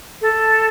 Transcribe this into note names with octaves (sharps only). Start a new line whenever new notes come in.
A4